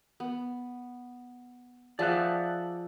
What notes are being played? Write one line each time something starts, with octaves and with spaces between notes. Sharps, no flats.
B3
F3 G#4 D5 E5 F#5 A5